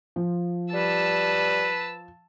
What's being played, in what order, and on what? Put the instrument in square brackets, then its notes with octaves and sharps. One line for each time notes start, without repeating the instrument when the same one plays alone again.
[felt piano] F3
[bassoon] G3 [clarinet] B4 [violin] A5 E6